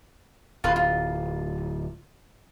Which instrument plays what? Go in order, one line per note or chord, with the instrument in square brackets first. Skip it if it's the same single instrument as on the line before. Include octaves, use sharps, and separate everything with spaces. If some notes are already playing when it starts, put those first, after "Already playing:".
[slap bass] D1 [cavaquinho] F4 B4 C6
[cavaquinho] F4